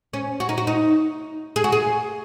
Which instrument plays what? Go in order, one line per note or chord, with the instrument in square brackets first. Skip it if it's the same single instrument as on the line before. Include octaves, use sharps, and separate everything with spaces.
[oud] C#4
F#4
D#4
F#4
D#4
G#4
F#4
G#4